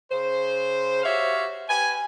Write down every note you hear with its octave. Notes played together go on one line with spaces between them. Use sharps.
C#3 C5
F#4 G4 C#5 E5 F5
G4 B4 G#5